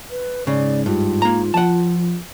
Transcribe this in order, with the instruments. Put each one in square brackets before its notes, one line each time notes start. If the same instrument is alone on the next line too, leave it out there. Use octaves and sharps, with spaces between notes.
[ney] B4
[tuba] G#2 [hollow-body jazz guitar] C#3 [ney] D5
[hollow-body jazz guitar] G2 [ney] F4
[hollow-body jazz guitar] A#3 A#5
[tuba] F3 [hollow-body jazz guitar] F#5 A5